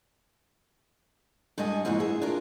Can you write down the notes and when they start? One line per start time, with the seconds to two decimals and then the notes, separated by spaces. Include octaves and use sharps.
1.58 G2 G#3 D#5 F#5 G#5
1.85 F2 G#2 E3 A#3 F#4
2.00 G#4 E5
2.21 D4 F4 A#4